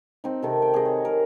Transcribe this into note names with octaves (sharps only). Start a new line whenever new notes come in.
C4 D#4
C3 D#3 A4
G5
G#4 D#5
C#5
A#4